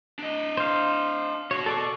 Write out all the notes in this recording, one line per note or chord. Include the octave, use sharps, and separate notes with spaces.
D4 D#5
C5 F5
B2 F#4 C#5
A4 D5 C#6